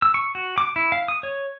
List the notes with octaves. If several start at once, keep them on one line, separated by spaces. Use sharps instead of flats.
E6
C#6
F#4
D6
E4
F5
D#6
C#5